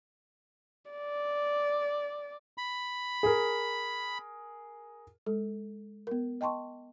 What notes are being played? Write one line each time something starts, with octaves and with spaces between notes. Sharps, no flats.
D5
B5
G#4 A#4
G#3 A4
B3 A#4
D#5 G5 A5 C6 C#6